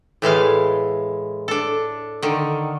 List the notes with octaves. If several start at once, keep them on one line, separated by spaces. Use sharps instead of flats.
A2 E3 G#3 F5
D4 A4
D3 D#3